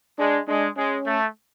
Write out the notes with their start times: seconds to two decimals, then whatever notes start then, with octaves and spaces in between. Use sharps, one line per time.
0.18 G#3 D4
0.48 G#3 D4
0.77 G#3 C#4
1.06 A3